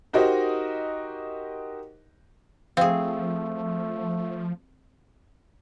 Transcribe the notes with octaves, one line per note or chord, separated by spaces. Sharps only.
D#4 F#4 G4 A#4 C5 D#5
F3 A3 C4 G#4 F5